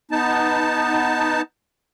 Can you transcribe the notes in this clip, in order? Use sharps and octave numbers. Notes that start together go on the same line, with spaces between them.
B3 D#4 A5